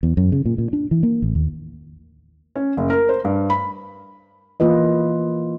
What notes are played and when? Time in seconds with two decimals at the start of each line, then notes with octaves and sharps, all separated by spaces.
0.03 E2
0.17 F#2
0.32 C#3
0.46 A#2
0.58 A#2
0.73 D4
0.91 E3
1.03 A#3
1.22 A1
1.35 D#2
2.56 C#4
2.77 F#1
2.90 A#4
3.09 C5
3.24 G2
3.50 B5
4.60 E3 A#3 F4 B4 D#5